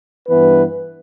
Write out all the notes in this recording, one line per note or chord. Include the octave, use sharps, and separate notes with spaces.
G2 E3 B3 B4